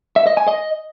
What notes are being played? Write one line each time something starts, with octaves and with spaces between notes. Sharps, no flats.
E5
D#5
G#5
D#5